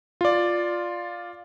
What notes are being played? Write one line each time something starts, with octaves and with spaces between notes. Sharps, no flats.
F4 D5